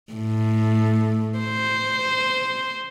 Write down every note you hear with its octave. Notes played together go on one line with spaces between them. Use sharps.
A2
C5